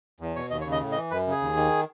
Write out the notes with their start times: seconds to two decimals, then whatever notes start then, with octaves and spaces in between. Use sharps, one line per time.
0.20 E2
0.36 B2 C#5
0.50 D#2 D#5
0.61 C#5
0.65 C#3
0.72 D#5
0.81 A2
0.92 D#5
0.96 E3
1.11 F#2 B4
1.27 C#3 G#4
1.41 D#2
1.56 D#3